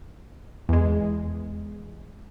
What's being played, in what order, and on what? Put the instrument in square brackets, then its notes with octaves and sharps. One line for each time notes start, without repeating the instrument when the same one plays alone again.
[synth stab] E2 G#3